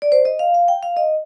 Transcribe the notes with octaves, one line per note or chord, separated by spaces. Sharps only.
D5
C5
D#5
F5
F5
G5
F5
D#5